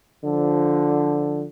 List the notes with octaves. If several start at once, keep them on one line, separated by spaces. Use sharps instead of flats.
D3 F3